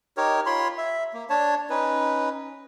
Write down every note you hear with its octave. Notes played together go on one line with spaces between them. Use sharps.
D#4 G4 A#4 C#5
F4 C#5 B5 C6
E5
A#3
D4 C#5 A5
C#4 D#4 B4